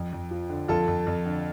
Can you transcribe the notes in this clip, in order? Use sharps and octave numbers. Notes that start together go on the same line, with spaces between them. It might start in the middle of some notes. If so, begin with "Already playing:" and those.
Already playing: F2
F2
F3
D3
F2 F4 A4
F2
F2
D3